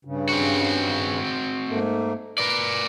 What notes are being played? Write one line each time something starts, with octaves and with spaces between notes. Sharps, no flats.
G2 C#3
C4 F#4
G#2 A3 A#3
A#4 B4 D5